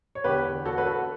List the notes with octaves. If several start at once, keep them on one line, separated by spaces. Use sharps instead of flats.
C#5
E2 D3 G4 B4
F#4 A4
B4
F#4 A4